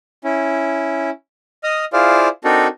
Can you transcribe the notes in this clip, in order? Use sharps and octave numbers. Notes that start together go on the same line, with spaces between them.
C#4 E4
D#5 D#6 F6
E4 F4 G#4 C5 D5 F5
C4 D4 D#4 F#4 A4 A#4